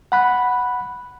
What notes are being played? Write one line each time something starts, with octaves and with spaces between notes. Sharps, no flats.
F#5 B5 F#6